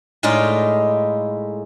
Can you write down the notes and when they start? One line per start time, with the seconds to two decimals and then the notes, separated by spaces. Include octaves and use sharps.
0.23 A2 G#3 D#4 F4 D5